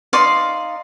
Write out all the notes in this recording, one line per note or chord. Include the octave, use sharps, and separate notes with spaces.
D#4 D5 F5 C6